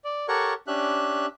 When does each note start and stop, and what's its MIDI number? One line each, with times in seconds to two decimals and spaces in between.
0.04 0.26 74
0.28 0.53 67
0.28 0.53 69
0.28 0.53 70
0.28 0.53 73
0.28 0.53 78
0.28 0.53 85
0.67 1.26 61
0.67 1.26 62
0.67 1.26 67
0.67 1.26 76
0.67 1.26 90